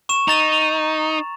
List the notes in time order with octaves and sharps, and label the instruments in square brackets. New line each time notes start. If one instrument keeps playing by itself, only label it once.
[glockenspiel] C#6 E7
[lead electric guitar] D#4 [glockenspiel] A#5 A6 F7